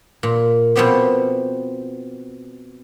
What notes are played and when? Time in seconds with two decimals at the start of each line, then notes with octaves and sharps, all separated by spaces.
0.23 A#2
0.76 B2 F3 B3 C4 G4